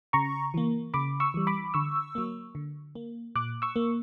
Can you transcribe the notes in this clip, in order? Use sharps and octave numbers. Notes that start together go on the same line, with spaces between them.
C#3 A#5 C#6
E3 A#3
C#3 B5 D6
C#6 E6
E3 G3
B5 D6
D3 C#6 E6
F#3 A#3
D3
A#3
A#2 D6 F#6
C#6 E6
A#3